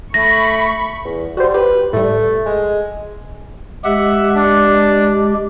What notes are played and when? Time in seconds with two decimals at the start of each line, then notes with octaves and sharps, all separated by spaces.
0.14 A3 B5 C#6 A#6
1.05 E2
1.37 G3 F#4 C5
1.54 G4 B4
1.93 A2 G3 A3
2.46 G#3
3.84 G#3 G4 E5 F#5
4.35 D4